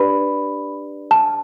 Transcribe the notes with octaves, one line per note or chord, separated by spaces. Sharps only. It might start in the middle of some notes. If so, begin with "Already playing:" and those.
Already playing: D4 G4 B4 D5 B5
A5